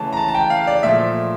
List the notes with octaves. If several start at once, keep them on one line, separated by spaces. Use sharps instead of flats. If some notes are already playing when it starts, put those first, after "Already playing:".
Already playing: C#3 E3 A3 A5
A#5
A5
A5
G5
F5
D5
A#2 F3 A3 E5